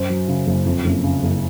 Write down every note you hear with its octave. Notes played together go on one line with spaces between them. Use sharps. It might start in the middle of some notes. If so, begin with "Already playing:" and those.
Already playing: F#2 C5
F#3
C#3
F#1
F2
F#1
C#3
F#1